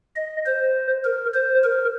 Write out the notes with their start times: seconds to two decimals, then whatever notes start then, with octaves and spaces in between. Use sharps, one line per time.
0.16 D#5
0.46 C5
1.04 A#4
1.34 C5
1.64 A#4